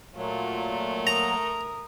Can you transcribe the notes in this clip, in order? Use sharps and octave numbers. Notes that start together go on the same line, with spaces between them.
A#2 F#3 A3 F4
A#4 A#5 D#6